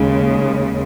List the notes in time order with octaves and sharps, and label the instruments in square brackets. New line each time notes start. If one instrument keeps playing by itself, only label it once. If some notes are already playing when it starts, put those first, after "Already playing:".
Already playing: [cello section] D#2 C#3 G#3